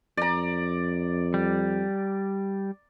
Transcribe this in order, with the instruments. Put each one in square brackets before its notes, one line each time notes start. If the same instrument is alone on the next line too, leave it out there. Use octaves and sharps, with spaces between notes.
[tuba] F2 [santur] D5 A#5
[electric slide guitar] G3